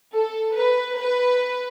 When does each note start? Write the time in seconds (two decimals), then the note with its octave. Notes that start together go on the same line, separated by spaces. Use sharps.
0.14 A4
0.56 B4
0.97 B4